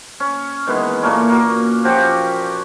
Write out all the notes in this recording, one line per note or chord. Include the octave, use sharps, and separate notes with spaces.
C#4
D#3 E3 G#3 B3
A#2 A3 A#3 C#4
A#3 F#4
F3 C#4 F#4 G4